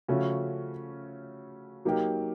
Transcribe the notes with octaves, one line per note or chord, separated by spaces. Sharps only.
C#3 F3 A3 C#4 F#4
F#3 A#3 D#4 G4 A#4